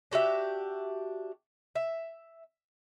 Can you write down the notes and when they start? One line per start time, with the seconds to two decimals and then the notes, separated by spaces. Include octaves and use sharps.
0.11 D4 F#4 G4 E5
1.75 E5